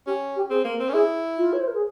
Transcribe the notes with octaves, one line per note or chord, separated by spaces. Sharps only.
C#4 G4
G4
C4 G#4
A#3
A#4
C4
C#4
E4 G#4
F4
C#5
C5
A#4
G#4